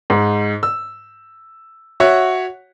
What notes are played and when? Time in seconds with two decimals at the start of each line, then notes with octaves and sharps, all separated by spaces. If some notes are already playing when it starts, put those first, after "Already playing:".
0.10 G#2
0.63 E6
2.00 F#4 C#5 E5 F#5